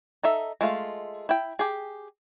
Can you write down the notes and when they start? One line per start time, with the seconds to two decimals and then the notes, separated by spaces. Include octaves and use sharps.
0.23 D#4 A4 E5
0.61 G#3 A3 F4 F5
1.29 E4 G5
1.59 G4 G#4